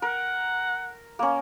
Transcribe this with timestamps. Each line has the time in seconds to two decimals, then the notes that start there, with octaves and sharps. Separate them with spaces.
0.02 A#4 F#5
1.19 A#3 C#4